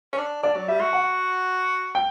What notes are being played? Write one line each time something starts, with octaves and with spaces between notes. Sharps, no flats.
C#4
D4
D4 D5
F#3
G3 E5
F#4
F#5
G5